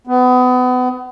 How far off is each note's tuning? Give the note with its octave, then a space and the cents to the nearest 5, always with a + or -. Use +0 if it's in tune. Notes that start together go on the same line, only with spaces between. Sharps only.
B3 +30